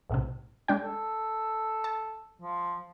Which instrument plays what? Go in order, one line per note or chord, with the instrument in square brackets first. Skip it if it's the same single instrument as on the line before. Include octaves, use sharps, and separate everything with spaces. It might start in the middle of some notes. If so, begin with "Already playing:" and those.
[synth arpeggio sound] B1 A2 C3
G#3 D4 G5
[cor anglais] A4
[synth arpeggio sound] A5
[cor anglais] F3